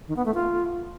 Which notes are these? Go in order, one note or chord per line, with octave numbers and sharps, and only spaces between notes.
D#3
B3
A3
F4